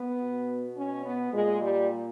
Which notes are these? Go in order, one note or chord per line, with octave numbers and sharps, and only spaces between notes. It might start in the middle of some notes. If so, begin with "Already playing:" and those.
Already playing: B3
B2
C#4
B3
A#2 G#3
G3